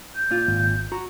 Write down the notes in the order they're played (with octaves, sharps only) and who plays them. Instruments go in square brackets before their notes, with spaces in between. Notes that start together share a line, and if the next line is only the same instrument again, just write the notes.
[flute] G6
[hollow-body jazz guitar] A#2 F4
[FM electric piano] G#1
[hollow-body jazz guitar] F#4 A#5